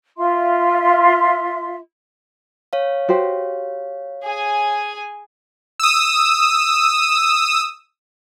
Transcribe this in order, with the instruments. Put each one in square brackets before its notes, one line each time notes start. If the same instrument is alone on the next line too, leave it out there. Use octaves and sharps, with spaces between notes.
[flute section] F4 E5 C6
[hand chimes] C#5 F5
[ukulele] F#4 G4 C5
[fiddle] G#4 G#5
[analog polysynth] D#6 E6